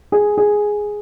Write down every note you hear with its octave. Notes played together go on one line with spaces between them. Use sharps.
G#4
G#4